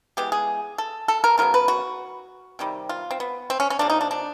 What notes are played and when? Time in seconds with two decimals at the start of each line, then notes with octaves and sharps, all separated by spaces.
0.17 E3 G#3 B3 G4
0.32 G#4
0.78 A4
1.08 A4
1.24 A#4
1.38 C#3 F#3 B3 A#4
1.54 B4
1.68 F#4
2.59 C3 D#3 G3
2.89 F4
3.11 C4
3.20 B3
3.50 C4
3.60 C#4
3.70 C#4
3.79 C3 F3 A#3 D4
3.90 D#4
4.01 D4
4.11 D4